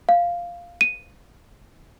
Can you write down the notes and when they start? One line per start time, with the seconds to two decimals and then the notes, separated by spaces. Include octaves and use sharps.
0.09 F5
0.81 D#7